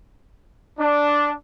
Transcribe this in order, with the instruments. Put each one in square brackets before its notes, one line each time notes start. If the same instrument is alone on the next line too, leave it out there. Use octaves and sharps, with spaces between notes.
[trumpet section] D4